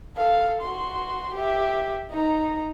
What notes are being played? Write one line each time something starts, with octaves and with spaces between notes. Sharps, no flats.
A4 F5
F#4 C6
G4 E5
D#4 A#5